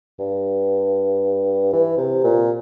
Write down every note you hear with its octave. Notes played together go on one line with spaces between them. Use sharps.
G2
E3
C3
A#2